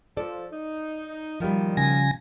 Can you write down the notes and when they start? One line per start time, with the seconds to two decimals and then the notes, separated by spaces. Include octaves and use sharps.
0.17 F3 A4 D5
0.51 D#4
1.40 F#2 A#2 D#3 F3 G3
1.77 C#3 G#5 A#6